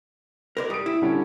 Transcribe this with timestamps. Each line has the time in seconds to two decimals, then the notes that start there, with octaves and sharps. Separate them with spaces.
0.57 A#4 C5 D5
0.70 G3 D#6 D7
0.86 E4
1.02 D3 G3 C#4